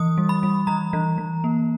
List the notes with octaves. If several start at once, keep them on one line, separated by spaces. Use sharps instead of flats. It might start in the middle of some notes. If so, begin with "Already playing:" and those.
Already playing: E3 D#6
G3
B5
G3
E3 A#5
E3
E3
A#3